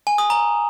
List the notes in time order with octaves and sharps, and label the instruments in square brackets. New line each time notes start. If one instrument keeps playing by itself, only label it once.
[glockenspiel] G#5
D#6
A#5